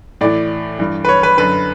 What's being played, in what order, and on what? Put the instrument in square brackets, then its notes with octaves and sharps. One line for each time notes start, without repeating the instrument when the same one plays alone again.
[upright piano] A2 E3 D5
G2 E3
B4
C#5
B4
F#2 D3 B4